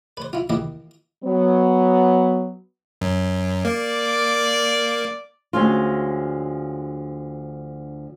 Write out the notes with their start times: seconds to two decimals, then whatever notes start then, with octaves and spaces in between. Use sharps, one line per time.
0.17 B4 C5
0.33 E4 F4
0.50 D#3 E3 A#3 E4 G4
1.24 F#3 B3
3.01 F#2
3.65 A#3 D5
5.53 D2 D3 F3 G#3 C#4 F4